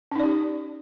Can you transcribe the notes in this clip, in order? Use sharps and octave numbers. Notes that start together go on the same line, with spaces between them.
C#4 D#4 G4 D5